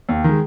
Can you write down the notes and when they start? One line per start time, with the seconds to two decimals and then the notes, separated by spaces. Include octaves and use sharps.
0.09 D#2
0.24 D#3 G#3